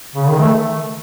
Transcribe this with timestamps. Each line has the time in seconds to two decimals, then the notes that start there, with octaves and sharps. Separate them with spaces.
0.16 C#3
0.28 D#3
0.40 A3